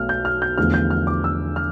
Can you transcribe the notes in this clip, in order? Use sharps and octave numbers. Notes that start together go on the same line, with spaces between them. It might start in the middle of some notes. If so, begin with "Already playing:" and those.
Already playing: B1 B2 A3 F6
G6
F6
G6
E2 D3 F3 A3 F6
G6
F6
D6
E6
F6